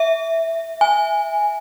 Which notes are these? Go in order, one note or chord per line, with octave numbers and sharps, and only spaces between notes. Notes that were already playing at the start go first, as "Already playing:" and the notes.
Already playing: E5
G#5